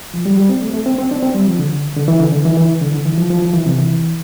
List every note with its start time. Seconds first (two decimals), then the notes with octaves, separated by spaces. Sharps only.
0.14 F3
0.26 G3
0.38 G3
0.49 C4
0.62 A3
0.74 A3
0.86 C4
0.98 C4
1.11 D4
1.23 C4
1.34 G3
1.47 F3
1.59 D3
1.96 D3
2.08 E3
2.20 D3
2.32 D3
2.45 E3
2.57 E3
2.81 D3
2.94 D3
3.05 E3
3.18 F3
3.30 F3
3.42 F3
3.54 E3
3.66 C3
3.78 E3